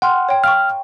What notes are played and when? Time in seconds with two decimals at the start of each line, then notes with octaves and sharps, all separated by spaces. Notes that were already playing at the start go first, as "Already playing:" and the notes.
0.02 F#5 G5 C6 F6
0.29 C#5 G5
0.44 F5 G5 C#6 F6